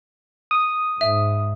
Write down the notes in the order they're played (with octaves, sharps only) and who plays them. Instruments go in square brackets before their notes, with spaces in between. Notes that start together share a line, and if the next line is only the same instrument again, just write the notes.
[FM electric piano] D#6
[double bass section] G#2 [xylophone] E5